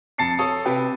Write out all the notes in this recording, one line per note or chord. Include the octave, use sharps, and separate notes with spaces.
F2 A5 A6 C7 C#7
A4 C#5 D#6
C3 G4 B4